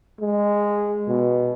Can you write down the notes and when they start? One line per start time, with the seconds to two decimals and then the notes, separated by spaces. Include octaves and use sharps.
0.21 G#3
1.08 B2